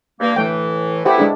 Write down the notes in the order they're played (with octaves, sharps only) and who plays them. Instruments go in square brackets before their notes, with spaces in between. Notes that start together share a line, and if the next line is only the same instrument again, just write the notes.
[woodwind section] G2 A#3
[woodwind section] A2 E3 [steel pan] A3 G5
[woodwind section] A3 B3 E4 [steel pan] G4 C5
[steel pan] G#3 D4 G#4